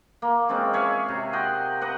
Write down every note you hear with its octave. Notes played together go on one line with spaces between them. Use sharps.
A#3
G#3 C4 C#4 F4
G#4 C#5 E5 F5
C3
D#5 F#5 G5 C6
B4 D#5 F#5 G5